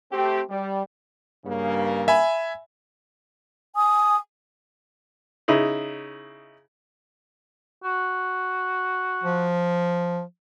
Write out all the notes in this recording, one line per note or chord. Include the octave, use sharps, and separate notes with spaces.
A3 C4 G4
G3
G2 C#3 A#3
E5 G#5 B5
G#5 D#6
C#3 D#4 E4
F#4
F3